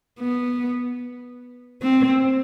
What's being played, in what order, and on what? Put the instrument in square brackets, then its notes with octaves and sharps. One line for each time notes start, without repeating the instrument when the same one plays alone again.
[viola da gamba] B3
C4